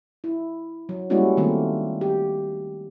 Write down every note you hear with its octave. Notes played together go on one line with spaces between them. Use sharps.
E4
F#3
G3 G#3 A#3 C#4 E4 F#4
D#3 G3 A3 A#3 C4
G4